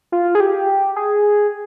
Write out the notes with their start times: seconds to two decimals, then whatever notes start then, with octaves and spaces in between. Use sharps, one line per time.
0.12 F4
0.35 G#4
0.40 G4
0.96 G#4